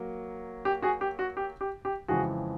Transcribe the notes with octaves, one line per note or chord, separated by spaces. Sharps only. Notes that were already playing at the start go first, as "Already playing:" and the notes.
Already playing: F#3 A#3
G4
F#4 G#4
G4
F#4
G4
G4
G4
F2 C#3 E3 G#3 F#4 G#4